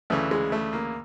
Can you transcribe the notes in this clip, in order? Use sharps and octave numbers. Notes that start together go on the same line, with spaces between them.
D2 C#3 E3 A3
G#3
A3
A#3